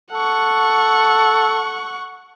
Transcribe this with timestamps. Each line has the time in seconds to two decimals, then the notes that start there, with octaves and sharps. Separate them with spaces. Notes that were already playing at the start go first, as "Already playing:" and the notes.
0.13 A4 F#5 C#6